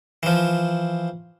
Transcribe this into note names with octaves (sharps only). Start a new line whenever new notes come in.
E3 F3